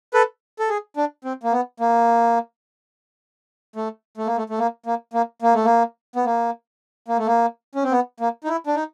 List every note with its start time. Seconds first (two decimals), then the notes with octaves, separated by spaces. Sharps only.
0.14 A4 B4
0.59 A4
0.69 G#4
0.97 D4
1.25 C4
1.43 A#3
1.52 B3
1.80 A#3
3.76 A3
4.17 A3
4.26 A#3
4.37 A3
4.50 A3
4.59 A#3
4.86 A#3
5.14 A#3
5.42 A#3
5.54 A3
5.65 A#3
6.16 B3
6.25 A#3
7.08 A#3
7.18 A3
7.27 A#3
7.75 C#4
7.84 C4
7.92 B3
8.20 A#3
8.44 D#4
8.48 E4
8.67 D4
8.75 D#4